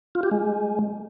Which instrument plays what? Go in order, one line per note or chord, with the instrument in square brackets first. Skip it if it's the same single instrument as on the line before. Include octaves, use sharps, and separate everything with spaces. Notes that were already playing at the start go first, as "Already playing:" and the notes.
[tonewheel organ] F4
G4
G#3